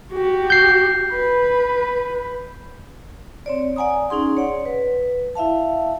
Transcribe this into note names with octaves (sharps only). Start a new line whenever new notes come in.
F#4 G4
G6 C7
B4
C4 C#5 D5
D5 F#5 G#5 A#5 D#6
C#4 D#4 G#4 C6
C#5 D5 F#5
B4
E4 E5 F5 A5